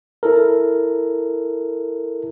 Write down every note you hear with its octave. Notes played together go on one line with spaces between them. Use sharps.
E4 A4 A#4